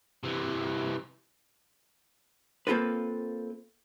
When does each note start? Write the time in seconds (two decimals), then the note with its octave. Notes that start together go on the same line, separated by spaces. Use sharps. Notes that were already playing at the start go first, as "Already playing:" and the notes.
0.23 C3 E3
2.67 A#3 C4 F4 A4 B4